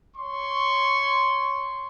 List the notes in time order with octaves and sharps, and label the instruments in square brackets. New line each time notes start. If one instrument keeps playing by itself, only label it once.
[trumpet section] C#5 C6 C#6